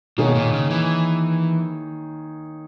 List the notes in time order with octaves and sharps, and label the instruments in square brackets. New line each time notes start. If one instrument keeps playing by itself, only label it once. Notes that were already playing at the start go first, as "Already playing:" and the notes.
[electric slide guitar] B2 [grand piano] D#3 A#3 D#4 G#4 C#5
[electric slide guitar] A#2
C#3
E3